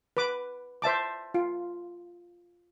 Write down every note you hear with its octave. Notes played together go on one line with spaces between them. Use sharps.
B4 D6
C5 E5 A5 D6
F4